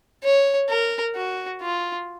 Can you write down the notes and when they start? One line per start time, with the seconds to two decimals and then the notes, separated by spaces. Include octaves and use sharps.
0.23 C#5
0.69 A#4
1.15 F#4
1.62 F4